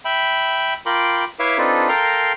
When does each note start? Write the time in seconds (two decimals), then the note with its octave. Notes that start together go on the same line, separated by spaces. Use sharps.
0.05 E5 G5 B5
0.86 F4 A#4 G5 B5 C6 D6
1.39 E4 B4 C#5 E5 F5 D6
1.58 C4 D4 D#4 F4 A4 B4
1.89 A4 A#4 F5 G5 A#5 C6